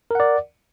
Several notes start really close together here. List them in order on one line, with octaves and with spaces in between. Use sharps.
A#4 F#5 D5